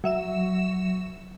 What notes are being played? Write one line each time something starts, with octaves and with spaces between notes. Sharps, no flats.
F#3 E5 E7